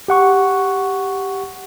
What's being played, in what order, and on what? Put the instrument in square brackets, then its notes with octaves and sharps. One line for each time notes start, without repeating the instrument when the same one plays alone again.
[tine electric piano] G4 F#5 C#6